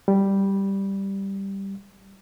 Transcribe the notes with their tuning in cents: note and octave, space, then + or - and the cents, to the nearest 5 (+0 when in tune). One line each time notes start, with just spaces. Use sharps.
G3 +0